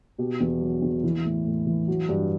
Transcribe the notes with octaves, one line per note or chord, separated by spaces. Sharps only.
B2 G4
E2
F#3
E2
E3 E4
A2
A2
E3
F#3 F#4
G2